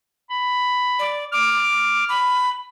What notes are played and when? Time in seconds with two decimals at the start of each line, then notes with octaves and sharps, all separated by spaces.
0.30 B5
0.99 D5
1.32 D6 F6
2.09 B5